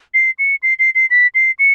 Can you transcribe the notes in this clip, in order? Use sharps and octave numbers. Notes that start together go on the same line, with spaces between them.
C7
C#7
C7
C7
C7
B6
C7
C#7